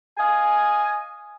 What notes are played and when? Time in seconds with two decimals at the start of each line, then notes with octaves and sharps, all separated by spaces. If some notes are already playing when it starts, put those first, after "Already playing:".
0.18 D#5 F5 G#5